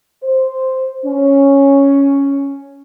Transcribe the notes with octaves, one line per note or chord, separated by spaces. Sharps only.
C5
C#4